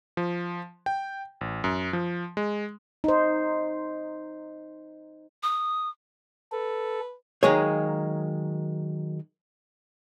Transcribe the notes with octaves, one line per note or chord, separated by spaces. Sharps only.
F3
G5
A1
F#2
F3
G#3
D#4 C5
D#6
A4 B4
D#3 F#3 G#3 A#3 G#4 C#5